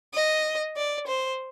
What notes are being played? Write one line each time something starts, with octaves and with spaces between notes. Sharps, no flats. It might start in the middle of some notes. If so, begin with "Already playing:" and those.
D#5
D5
C5